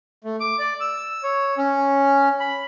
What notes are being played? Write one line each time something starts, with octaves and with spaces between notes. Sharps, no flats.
A3
D6
D5
E6
C#5
C#4
B5